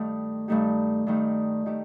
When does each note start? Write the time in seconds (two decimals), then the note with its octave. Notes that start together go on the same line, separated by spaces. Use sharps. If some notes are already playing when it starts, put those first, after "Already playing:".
Already playing: G2 D#3 A3 D#4 G4
0.48 G2 D#3 A3 D#4 G4
1.07 G2 D#3 A3 D#4 G4
1.66 D#3 A3 D#4 G4